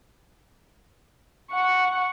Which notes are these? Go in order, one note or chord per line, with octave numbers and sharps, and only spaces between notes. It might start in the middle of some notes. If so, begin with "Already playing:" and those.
F#5 C#6